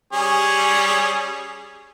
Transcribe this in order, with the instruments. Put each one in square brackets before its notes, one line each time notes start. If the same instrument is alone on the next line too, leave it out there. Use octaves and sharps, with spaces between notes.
[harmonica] G3 C#4 G#4